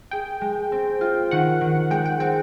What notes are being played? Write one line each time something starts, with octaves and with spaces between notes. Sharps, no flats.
G#4 G5
G#3
C4
F4
D#3 F#5
D#3
G#3 G5
G5
C4 G5